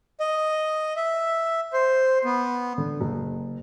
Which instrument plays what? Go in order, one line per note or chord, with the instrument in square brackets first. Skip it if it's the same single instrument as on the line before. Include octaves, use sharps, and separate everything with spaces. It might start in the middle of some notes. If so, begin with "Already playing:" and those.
[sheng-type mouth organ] D#5
E5
C5
B3
[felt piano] D3
F#1